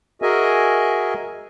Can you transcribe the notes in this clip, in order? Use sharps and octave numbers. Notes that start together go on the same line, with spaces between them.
F#4 G#4 A#4 D#5 E5 G#5